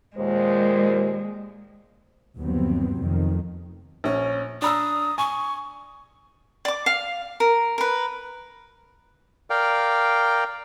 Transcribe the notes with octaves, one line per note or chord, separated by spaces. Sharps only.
D#2 A#2 G#3 C5
G1 D#2 F3 F#3 B3 C4
F1 F2 D#3
A#1 C#4
D4 A#5 D#6 E6
G#5 C#6
D5 D6
F5
A#4
A#4 B4
A#4 D5 F5 G5